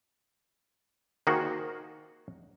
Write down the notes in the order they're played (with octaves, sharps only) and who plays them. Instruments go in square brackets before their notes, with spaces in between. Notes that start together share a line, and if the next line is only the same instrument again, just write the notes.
[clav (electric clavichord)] D#3 A#3 D#4 F#4 G#4 C5